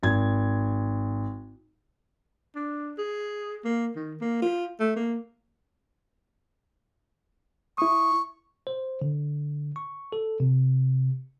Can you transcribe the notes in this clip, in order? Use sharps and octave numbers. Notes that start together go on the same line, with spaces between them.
G#1 G#6
D4
G#4
A#3
D#3
A#3
F4
A3
A#3
E4 C#6 D#6
C5
D3
C#6
A4
C3